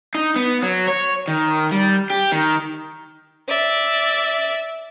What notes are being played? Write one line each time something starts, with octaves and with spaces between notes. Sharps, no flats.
D#4
B3
F#3
C#5
D#3
G3
G4
D#3
D5 E5